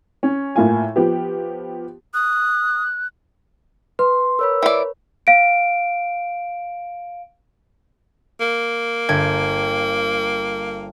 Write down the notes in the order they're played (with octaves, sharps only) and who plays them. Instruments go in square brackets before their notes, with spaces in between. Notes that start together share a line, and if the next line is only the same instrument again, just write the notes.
[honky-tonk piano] C#4
A2 A#3 F4 G#5
F3 B3 G4
[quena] D#6 [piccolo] F#6
[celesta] B4 [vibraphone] C6
[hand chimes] A#4 C#5 B5 [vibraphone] E6
[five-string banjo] E3 D5
[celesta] F5 D7
[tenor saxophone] A#3
[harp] G1 G5 G#6